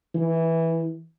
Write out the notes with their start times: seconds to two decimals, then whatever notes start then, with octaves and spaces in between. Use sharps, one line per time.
0.15 E3